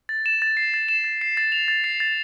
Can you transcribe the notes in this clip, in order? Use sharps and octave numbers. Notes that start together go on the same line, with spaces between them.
A6
E7
A6
C7
A6
E7
A6
C7
A6
F7
A6
C7
A6